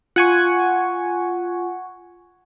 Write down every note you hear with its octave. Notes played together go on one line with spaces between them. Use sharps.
F4 F#5 G#5 C#6